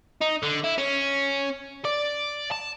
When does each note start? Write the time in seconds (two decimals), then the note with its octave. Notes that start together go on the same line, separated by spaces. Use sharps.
0.21 D#4
0.43 D3
0.64 E4
0.78 C#4
1.85 D5
2.52 A5